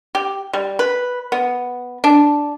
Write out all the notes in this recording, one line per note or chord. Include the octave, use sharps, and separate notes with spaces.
G4
G3
B4
B3
D4